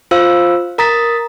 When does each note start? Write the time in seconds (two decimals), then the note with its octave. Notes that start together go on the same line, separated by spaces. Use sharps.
0.11 F4 C5 F5 E6
0.78 A#4 A#5 D#6 A6 B6